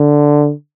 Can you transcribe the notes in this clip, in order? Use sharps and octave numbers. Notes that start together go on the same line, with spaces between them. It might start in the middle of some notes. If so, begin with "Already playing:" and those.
Already playing: D3